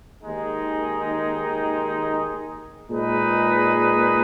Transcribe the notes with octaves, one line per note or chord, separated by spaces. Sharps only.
D#2 D#3 G#3 D#4 G#4
A#2 G#3 D#4 G#4 B4